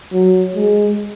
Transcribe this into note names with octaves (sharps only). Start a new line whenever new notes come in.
F#3
G#3